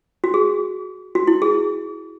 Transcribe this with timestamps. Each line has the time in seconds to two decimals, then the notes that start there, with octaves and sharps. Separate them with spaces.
0.24 F#4
0.34 G#4
1.15 F#4
1.27 E4
1.42 G#4